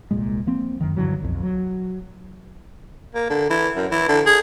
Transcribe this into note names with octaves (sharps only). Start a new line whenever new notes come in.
D#1 C2 A#2 G#3
F3 A#3 C4
F#2 D#3
G2 D3 E3 F#3
B1 F2 B2
F#3
A#3
D3
E3
F#2
E3
D3
G#4